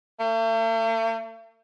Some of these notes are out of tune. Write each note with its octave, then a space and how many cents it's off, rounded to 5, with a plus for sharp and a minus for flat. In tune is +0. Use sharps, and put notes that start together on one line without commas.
A3 +45